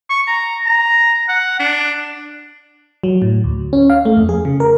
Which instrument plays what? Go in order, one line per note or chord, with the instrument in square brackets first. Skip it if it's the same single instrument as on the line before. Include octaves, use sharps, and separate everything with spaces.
[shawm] C#6
A#5
A#5
F#5
D4
[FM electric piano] F#3
A2
D2
C#4
F5
A3
F2
G#4
C#3
A#4